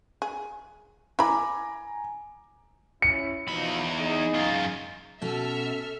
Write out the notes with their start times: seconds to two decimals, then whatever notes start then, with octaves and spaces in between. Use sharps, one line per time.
0.22 G#4
1.19 E4 G#5 A#5 B5 D6
3.02 C#4 E4 C#7
3.48 E2 B2 F3 D#4 B5
4.00 D#4 G#4
4.34 F#2 F4
5.22 B2 C#4 A4 E5 F6